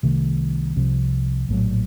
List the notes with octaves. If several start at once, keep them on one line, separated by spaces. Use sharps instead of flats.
C2 C3 D#3 A3
C2 C3 F3
A#1 A2 F#3